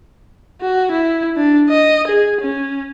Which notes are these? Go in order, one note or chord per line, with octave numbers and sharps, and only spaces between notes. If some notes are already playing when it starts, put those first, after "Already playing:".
F#4
E4
D4
D#5
G#4
C#4